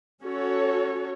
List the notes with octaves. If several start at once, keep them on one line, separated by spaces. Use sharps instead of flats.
C#4 F#4 A4 C#5